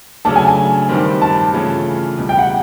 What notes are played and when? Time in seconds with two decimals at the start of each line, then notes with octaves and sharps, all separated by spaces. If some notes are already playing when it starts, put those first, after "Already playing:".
0.25 C#3 F#3 A3 D4 A5
0.36 G#5
0.47 G#5
0.89 G2 D#3 G3 C4
1.22 A5
1.53 C#3 E3 A3 C#4 F4
2.17 C#2 B2 G3
2.29 G5
2.39 F#5